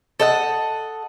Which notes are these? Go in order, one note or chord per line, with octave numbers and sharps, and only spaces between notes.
A4 D#5 F#5